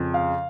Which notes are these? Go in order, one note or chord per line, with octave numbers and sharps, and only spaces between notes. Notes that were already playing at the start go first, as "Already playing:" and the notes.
Already playing: F2 C#3
F5